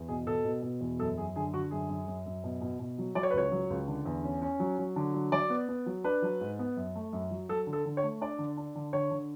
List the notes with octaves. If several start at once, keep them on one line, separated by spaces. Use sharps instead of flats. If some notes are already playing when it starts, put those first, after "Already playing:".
Already playing: E2
B2 G#4
B2 A4
B2
B2
E2
F#2 A4
F#2 G#4
D3 G#4
D3 F#4
F#2 G#4
F#2
F#2
F#2
B2
B2
B2
F#3
F#3 D5
C#5
B4
C#2 C#5
F#3
C#2
D3
E2
C#4
C#4
F#3
F#3
D3
F#3
F#3 D5
B3
B3
F#3
D4 B4
F#3
G#2
B3
F#2
A3
F#2
F#3
F#3 A4
D3
A4
D3
C#5
A3
D4 D5
D3
D4
D3
D3 C#5
D3